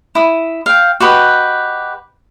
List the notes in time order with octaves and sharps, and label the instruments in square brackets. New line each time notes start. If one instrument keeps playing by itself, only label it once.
[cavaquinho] E4 D#6
F5 G5
F#4 G4 B4 D#5